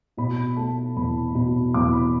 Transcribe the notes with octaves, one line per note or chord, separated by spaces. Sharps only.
B2 B5
A3 A5
E2 B5
B2 B5
E2 D6
B5